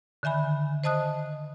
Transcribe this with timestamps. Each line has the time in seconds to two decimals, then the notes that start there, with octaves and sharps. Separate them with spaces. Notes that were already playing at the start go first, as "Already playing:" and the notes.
0.23 D3 D#3 E5 G#5 B5
0.84 C5 D#5 A5 D#6 F#6